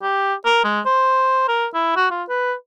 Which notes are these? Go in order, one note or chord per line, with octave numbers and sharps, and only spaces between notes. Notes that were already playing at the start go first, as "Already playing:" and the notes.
G4
A#4
G#3
C5
A#4
E4
F#4
F4
B4